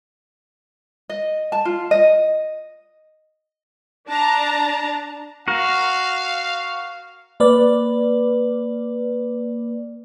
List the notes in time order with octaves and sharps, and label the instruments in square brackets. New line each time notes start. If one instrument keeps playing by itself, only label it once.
[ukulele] D#5
A5
F4
D#5
[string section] D4 A5 A#5
[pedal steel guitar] F#4 A#4 [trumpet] F5
[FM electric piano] A#3 B4 D5